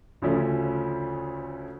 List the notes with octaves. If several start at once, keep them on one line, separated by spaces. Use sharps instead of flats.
D2 C#3 F3 A3 C#4